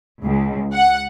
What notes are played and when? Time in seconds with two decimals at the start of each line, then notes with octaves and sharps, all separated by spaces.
0.23 C#2
0.74 F#5